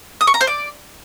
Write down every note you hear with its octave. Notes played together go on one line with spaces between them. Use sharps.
D#6
C#6
A#5
C5
D5